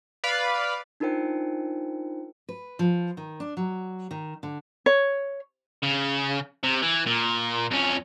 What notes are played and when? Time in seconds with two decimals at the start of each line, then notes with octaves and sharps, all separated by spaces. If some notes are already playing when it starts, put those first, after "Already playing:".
0.24 B4 D5 F5 B5
1.00 D4 D#4 F4 A#4 C5 G5
2.49 B4
2.79 F3
3.17 D#3
3.40 D4
3.57 F#3
4.11 D#3
4.43 D3
4.86 C#5
5.83 C#3
6.64 C3
6.82 E3
7.06 A#2
7.71 F2 C#4